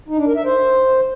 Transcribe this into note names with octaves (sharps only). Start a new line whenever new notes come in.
D#4
D4
A#4
E5
C5